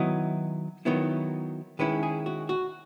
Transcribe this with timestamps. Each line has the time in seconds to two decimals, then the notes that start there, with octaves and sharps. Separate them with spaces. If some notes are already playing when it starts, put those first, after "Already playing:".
Already playing: D#3 F#3 B3 E4 D#5
0.85 D#3 F#3 B3 E4
1.79 D#3 G#3 C#4 E4 B4
2.03 G#4
2.26 F#4
2.49 F#4